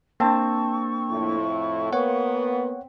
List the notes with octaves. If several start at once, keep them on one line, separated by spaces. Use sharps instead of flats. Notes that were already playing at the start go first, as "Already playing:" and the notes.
A#3 C4 D4 A5 C#6
F2 A2 E4
A#3 B3 C#5 F#5